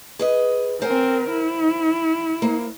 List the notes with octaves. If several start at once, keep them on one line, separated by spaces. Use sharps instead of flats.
G#4 B4 D#5
C4 A#4 C5 F#5 G#5
E4
A#3 C5